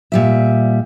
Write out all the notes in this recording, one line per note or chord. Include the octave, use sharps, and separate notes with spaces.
A#2 G3 E5